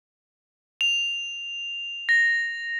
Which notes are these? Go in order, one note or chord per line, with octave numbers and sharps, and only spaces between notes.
F7
A#6